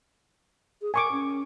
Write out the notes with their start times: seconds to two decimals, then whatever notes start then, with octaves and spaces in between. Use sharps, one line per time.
0.81 G#4
0.94 A#4 G#5 C#6 D6
1.11 C#4